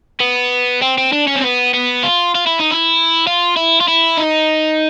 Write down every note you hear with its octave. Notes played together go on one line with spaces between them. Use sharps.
B3
C4
C4
D4
C#4
C4
B3
B3
F4
F4
E4
D#4
E4
F4
E4
F4
E4
D#4